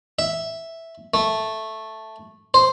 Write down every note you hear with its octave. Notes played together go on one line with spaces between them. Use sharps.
E5
A3
C5